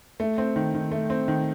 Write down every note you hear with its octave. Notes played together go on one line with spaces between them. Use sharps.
A3
C4
D#3
D#3
A3
C4
D#3